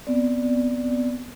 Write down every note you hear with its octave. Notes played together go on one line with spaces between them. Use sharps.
B3 C4 D5